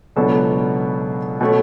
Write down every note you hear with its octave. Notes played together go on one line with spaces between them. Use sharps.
C#2 B2 F#3 B3 D4 A4
B2 A3 C#4